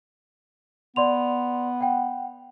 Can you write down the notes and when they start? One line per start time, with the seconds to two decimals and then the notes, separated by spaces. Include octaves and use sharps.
0.96 B3 D5 C6 F7
1.81 F#5 G5